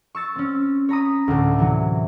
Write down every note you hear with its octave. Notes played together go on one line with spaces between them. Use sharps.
C#6 E6 A6 C#7
C4 C#4
C#5 A#5 B5 D#6
D2 A2
C3 E3 F#3